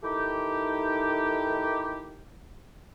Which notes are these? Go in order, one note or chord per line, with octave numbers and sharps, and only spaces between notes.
D#3 A3 D#4 E4 G4